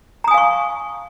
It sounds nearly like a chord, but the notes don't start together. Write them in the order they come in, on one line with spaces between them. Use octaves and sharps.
A#5 D#6 G#5 F5 C#6